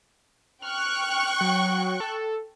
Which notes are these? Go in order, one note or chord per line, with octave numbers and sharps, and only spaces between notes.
G5 C#6 F6 F#6
F#3
A4